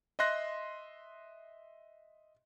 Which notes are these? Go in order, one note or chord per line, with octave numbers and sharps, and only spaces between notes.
D#5 E5 C6 F#6 A#6